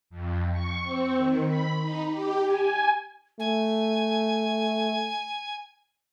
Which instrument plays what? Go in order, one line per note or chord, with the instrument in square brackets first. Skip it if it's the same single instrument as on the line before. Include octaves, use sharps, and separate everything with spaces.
[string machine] F2
C#6
C4
D#3
B5
D#4
G4
G#5
[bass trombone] A3 [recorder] G#5